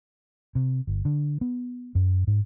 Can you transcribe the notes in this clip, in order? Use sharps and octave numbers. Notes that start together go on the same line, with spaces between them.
C3
G1
D3
B3
F#2
G#2